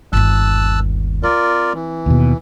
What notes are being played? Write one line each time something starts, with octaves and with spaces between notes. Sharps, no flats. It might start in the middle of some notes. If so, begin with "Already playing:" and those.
G1 D#2 A5 E6 F#6
C4 F4 A#4 D5
E3
D#2 B2